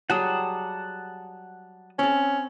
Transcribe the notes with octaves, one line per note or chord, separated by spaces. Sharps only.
F#3 G3 G#4 F#5 A5 D#6
C4 C#4 A4